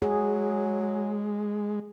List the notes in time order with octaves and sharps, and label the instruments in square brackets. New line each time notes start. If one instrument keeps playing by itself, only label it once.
[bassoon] F#3 [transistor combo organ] G#3 [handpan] G#4